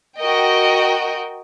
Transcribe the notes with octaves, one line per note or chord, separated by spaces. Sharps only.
F#4 A#4 D#5 G5